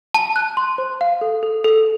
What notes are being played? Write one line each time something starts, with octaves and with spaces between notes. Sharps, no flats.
A5
F#6
C6
C5
F5
A4
A4
A4